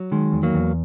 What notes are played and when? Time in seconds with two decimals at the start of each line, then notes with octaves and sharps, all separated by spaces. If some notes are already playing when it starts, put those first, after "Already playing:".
Already playing: F#3
0.12 D#3 G#3
0.32 E2
0.43 F#3 A#3
0.54 E2